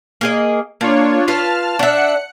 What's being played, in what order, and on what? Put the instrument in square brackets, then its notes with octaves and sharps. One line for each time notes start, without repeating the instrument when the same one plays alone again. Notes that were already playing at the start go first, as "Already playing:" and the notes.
[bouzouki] A#3 G#4 D#5
[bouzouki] A#3 [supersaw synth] D4 F4 C#5
[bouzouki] F4 B4 F5 [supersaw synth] A5 F6
[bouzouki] D4 E5 [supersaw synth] F#5 F#6 C#7